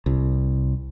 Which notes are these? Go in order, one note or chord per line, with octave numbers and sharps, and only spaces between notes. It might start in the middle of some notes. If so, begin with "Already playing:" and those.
C2